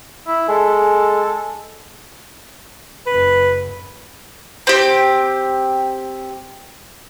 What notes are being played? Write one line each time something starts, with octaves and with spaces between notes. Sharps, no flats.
E4
G#3 A4
F#1 F#2 B4
C4 G4